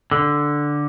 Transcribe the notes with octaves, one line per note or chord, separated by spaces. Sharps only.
D3